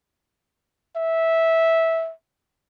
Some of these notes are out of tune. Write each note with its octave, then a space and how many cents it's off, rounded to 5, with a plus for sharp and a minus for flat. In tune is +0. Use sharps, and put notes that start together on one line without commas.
E5 -10